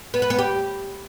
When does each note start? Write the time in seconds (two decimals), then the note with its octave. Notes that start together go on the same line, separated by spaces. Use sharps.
0.14 B3
0.22 B4
0.30 B3
0.38 G4